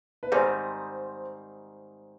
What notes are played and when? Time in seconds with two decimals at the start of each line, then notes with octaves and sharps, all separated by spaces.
0.23 B4
0.32 G#2 D#3 G3 C4 D#4 C5